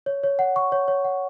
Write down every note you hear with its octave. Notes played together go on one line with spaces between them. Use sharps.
C#5
C#5
F#5
C#6
C#5
C#5
F#5